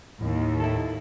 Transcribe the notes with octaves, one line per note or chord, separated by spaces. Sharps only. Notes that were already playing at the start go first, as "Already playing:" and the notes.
D#2 A2
E4 A4